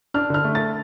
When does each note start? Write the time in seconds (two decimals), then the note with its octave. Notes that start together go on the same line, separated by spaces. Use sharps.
0.14 D4 F6
0.30 D3 F6
0.44 A3
0.55 A6